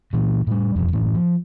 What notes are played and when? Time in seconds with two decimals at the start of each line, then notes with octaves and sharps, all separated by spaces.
0.13 A#2 E3
0.47 A2 G3
0.75 E1 A1 F2
0.93 F#1 A2 E3
1.15 F3